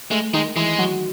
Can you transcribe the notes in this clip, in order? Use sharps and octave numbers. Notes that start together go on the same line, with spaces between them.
G#3 A3
D#3 G#3 D#4
E3 G#3 E4
F#3 F#4